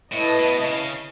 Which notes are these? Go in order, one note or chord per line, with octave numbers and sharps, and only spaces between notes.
A2 E4 B4 D#5 A5
B2
B2
C#3